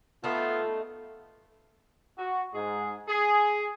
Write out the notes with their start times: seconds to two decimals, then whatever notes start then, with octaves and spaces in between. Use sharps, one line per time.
0.24 A3 B3 D#4 F4 A4
2.18 F#4
2.54 G#2 G#4
3.09 G#4